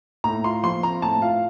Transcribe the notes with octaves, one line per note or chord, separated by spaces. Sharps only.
A2 A#5
F4 C6
F3 C6
C4 A#5
A2 A5
F4 F5